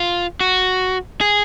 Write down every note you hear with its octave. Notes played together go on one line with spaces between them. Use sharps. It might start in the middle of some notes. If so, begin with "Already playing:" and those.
Already playing: F4
F#4
G#4